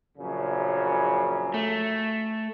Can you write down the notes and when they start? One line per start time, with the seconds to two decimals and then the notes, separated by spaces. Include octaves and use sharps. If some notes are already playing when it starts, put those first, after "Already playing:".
0.18 A#1 F#2 C#3
1.54 A3